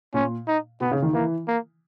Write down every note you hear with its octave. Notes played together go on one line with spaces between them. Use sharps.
A#2 C#4
D#4
B2 B3
C#3
D#3
E3 A#3
A#3